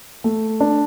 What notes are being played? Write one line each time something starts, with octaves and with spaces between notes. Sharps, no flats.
A3
D4